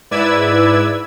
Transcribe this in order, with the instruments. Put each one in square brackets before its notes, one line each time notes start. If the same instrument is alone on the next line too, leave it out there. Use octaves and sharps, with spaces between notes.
[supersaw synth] G#2 E4 B4 D5 E6 G#6